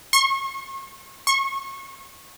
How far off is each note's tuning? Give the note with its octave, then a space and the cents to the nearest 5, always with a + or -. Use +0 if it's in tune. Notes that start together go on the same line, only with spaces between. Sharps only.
C#6 -40
C#6 -25